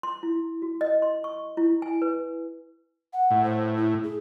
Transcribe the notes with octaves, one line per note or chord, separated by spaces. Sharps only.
C6
E4
F#4
D#5
C6
C#6
E4
G#5
B4
F#5
A2
C5
E4
G#4